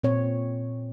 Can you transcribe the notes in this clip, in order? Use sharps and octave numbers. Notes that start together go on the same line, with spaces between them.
A#2 C4 C#5